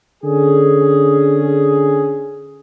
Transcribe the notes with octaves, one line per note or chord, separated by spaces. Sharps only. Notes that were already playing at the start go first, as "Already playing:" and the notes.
D3 C#4 G#4